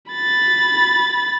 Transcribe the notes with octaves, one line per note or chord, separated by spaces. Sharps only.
B5 A6